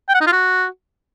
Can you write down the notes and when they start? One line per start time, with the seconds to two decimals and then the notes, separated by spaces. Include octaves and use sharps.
0.09 G5
0.15 F#5
0.21 D#4
0.27 F4
0.33 F#4